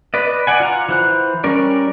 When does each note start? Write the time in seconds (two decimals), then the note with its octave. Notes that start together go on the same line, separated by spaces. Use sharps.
0.14 B4 D5 D#5
0.47 D5 F#5 G#5
0.60 F4 F#5 A#5
0.89 E3 C5 F#6
1.44 G3 C#4 A#4 D5